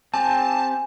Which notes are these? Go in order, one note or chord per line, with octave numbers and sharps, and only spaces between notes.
C4 G4 G#5 A5